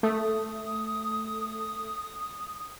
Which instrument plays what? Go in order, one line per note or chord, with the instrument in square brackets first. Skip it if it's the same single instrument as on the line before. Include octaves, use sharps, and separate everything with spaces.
[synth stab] A3 [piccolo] D#6